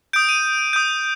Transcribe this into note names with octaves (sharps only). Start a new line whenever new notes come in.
D#6 G6 D7
D#7
D#6 G6